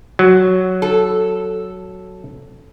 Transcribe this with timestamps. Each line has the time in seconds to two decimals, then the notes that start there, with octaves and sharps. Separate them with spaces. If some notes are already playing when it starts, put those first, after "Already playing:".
0.19 F#3
0.82 A4